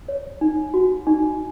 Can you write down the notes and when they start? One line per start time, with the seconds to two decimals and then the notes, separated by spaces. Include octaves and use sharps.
0.08 C#5
0.41 D#4
0.74 F#4
1.07 D#4